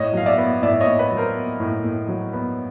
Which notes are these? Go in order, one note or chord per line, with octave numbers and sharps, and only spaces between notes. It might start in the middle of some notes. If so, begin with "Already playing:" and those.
Already playing: A2 C#5 D#5
F#3 F5
D5 E5
B3
A2 D5 E5
C#5 D#5
A2
B4 C#5
F#3
A#4 C5
B3
A2
A2
F#3
B3